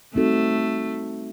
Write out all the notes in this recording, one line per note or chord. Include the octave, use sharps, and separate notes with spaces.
G3 A3 C4 D#4 F#4 A4